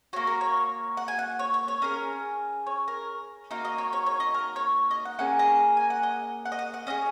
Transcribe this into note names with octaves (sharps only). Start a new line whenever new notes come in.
A#3 F#4 C#5
A#4
C#5
F#5
G#5
F#5
C#5
C#5
C#5
C#4 G#4 A#4
C#5
A#4
A#3 D#4 F#4
D#5
C#5
C#5
C#5
D#5
A#4
C#5
D#5
F#5
A#3 C#4 G#4 F#5
D#5
G#5
F#5
D#5
F#5
D#5
F#5
F#5
C#4 G#4 D#5